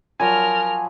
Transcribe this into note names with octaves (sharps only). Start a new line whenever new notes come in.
F3 F#3 A#4 G#5 B5 F6